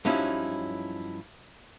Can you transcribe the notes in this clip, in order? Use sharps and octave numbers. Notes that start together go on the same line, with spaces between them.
G2 F3 F#3 C#4 D#4 E4